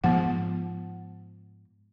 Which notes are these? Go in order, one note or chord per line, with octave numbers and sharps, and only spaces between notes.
G#2 F3 B3 F#5